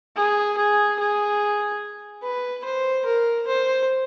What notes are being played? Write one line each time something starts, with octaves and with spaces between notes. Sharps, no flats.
G#4
G#4
G#4
B4
C5
A#4
C5